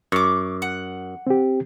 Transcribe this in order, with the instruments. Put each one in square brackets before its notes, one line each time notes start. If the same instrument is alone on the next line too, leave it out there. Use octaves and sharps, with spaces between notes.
[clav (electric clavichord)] F#2 [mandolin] C#6 D6
[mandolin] F#5
[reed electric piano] C4 G4